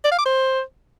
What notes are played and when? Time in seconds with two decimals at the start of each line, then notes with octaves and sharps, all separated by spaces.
0.04 D5
0.11 F5
0.18 D6
0.26 C5